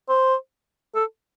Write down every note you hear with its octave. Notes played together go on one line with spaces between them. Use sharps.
C5
A4